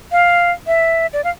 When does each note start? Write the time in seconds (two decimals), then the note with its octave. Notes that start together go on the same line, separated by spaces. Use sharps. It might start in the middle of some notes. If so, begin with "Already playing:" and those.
0.12 F5
0.67 E5
1.13 D5
1.24 F5